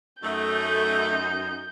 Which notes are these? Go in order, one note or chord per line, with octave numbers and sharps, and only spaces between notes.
F#2 A3 D#4 G6